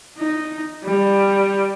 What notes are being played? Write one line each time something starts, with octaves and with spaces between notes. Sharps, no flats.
D#4
G3